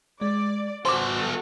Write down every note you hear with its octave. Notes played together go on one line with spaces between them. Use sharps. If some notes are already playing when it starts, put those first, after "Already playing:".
G#3 D5
B3 F#4 A4 C5 C6 D6